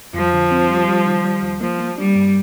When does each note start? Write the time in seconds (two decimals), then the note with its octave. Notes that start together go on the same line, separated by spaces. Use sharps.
0.14 F2 F3
0.33 D3
0.51 C4
0.70 G3
0.87 G3
1.06 D#3
1.24 G3
1.42 D#2
1.60 F3 A#3
1.79 A#3
1.98 G3 D4
2.15 G2